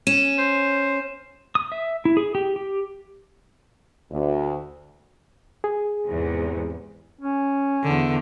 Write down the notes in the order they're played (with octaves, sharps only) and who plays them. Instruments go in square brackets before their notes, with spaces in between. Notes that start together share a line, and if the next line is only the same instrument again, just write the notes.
[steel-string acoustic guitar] C#4 [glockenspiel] D#7 E7
[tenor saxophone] C5
[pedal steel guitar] D#6
E5
E4
G#4
G4
G4
[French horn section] D2
[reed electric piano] G#4
[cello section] E2 G#2 C3
[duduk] C#4
[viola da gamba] E2 D3